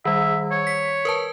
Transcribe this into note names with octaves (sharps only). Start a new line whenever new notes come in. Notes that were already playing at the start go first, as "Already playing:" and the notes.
D#3 G3 E5
C#5
B6
A#4 B4 A5